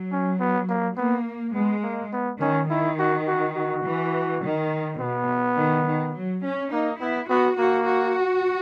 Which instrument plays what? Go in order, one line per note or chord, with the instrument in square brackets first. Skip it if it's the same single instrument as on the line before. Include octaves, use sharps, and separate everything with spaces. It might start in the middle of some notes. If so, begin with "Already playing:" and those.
Already playing: [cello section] F#3
[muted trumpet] C#4
B3
A#3
[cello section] A#3 [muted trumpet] B3
[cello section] G#3 [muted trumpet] B3
[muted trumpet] A#3
B3
[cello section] D#3 [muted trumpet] C#4
[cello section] D#3 [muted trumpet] E4
[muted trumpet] F#4
F#4
F#4
[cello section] E3
D#3
[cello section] B2 [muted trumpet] B3
[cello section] D#3
D#3
F#3
C#4
[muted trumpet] A#3 [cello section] D#4
[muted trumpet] B3 [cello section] E4
[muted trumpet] B3 [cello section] F#4
[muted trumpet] A#3 [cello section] F#4
[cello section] F#4